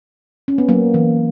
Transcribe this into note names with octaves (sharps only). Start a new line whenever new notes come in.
C#4
B3
F#3 A#3
E3